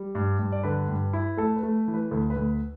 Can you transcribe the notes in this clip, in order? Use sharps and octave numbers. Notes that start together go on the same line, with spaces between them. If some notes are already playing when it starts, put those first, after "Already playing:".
Already playing: G3
G2
G2
D5
D3 B4
G2
E4
A3 A4
B4
A3
E3
B4
D2 A4
B4
D2